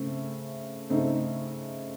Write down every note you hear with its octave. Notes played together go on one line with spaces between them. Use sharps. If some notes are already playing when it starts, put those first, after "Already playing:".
Already playing: C#3 A3 C4
C#3 A3 C4 D#4